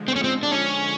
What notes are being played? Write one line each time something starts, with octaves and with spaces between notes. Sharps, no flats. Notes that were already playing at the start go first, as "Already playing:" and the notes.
Already playing: D3 F3 G#3
C4
C#4
C4
D4
C#4